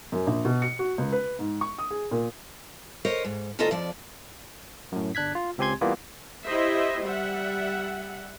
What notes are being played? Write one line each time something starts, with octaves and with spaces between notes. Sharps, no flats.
F#2
A#1
B2
C#7
F#4
C#2
B4
G#2
C#6
D#6
G#4
A#2
A#4 C5 C#5 D#5
G#2
D2 C#4 F4 A4 D#5 A#5
F2 F3 D5
F#2 A2
G1 D4 F#6 G#6 B6
F4
C#2 C4 G4 G#5 C6 G#6
E3 G3 A#3 B3 F4
E4 G4 C5 D#5 E5
G3 E5 F#5